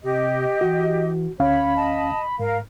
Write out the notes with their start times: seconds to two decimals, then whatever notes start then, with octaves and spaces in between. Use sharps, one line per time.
0.03 C3 G4 D#5
0.61 E3 F#4
1.40 D2 C#4 C#5 F5 B5
1.76 D#5 A5
2.39 G#2 A#4 F5